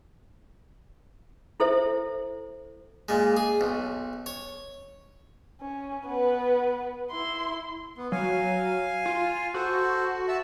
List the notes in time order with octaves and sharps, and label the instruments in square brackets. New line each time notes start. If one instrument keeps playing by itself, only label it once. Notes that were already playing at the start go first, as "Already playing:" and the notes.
[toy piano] E4 A4 C5 E5
[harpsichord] A#2 G#3
G#4
B1
C#5
[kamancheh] C#4
B3 B4
E4 C6
[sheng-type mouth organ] B3
[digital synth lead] F#3 [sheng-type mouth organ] F5 G#5
[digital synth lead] F4
[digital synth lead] F#4 [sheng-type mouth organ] A4 C5
[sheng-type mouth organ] E5 A5